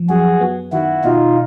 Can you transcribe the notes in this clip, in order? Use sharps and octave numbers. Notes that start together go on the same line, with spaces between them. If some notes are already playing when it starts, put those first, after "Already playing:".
Already playing: F3
F#2 F#4 G#4
B3
D#3 E4 F#4
B2 D#4 F4